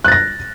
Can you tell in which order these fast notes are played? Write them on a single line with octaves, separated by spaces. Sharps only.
F#6 A6 A#6